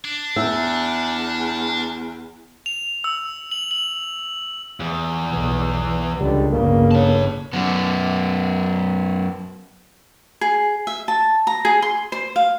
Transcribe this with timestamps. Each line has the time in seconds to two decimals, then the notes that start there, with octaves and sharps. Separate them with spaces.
0.04 D4
0.36 E2 E5
2.66 F7
3.04 E6
3.52 F#7
3.71 F#7
4.80 E2
5.30 B1
6.19 C#2 D3 G3
6.51 G1 C#3 A#3
6.91 C#5 A5
7.53 F#2 B3
10.41 G#4
10.87 E5
11.08 A5
11.47 A#5
11.65 G#4
11.82 C6
12.12 C5
12.36 F5